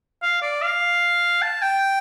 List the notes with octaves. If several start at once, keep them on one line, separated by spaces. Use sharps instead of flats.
F5
D5
F5
A5
G5